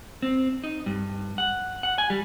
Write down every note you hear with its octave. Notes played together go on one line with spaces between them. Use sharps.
C4
D#4
G2
F#5
F#5
G#5
G3